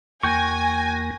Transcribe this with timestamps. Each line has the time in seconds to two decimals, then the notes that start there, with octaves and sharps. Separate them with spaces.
0.23 E2 A#3 F#4 G5 G#5 C#6 A#6